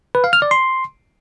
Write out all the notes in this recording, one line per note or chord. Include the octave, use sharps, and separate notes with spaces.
B4
F5
F6
D5
C6